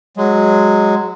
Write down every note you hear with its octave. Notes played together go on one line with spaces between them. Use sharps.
F#3 G#3